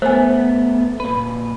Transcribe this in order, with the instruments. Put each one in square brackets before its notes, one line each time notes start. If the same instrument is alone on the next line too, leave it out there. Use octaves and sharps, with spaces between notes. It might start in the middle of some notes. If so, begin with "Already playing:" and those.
[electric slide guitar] A3 B3 [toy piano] C5 G#5
[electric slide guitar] A#2 B4